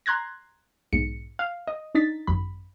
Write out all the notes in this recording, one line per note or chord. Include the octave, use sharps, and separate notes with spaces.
A#5 C6 F#6 G#6 A#6
B1 G#2 C#7
F5
D#5
D4 D#4 A6 B6
G#1 F#2 B5